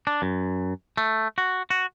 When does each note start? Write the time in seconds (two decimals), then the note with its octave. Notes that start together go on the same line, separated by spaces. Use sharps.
0.07 D4
0.22 F#2
0.97 A3
1.38 F#4
1.70 F#4